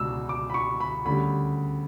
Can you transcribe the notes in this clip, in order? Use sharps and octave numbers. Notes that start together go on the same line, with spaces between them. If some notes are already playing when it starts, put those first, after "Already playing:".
Already playing: C#2 B2 D4 E6
D6
B5
C#6
B5
D2 C#3 G3 B5